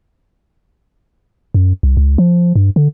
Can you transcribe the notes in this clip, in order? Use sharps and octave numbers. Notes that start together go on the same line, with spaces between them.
F#2
C2
C#2
F3
G2
D3